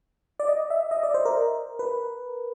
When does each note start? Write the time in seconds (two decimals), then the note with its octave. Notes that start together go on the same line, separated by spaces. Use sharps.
0.40 D5
0.48 D#5
0.70 E5
0.91 D#5
1.03 D5
1.14 C5
1.25 A#4
1.79 B4